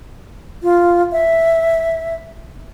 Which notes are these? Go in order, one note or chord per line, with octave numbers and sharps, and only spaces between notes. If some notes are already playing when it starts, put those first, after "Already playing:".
F4
E5